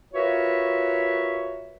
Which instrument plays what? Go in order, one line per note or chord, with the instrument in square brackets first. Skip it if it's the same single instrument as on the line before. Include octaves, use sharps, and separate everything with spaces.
[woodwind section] F4 F#4 A#4 B4 C#5 E5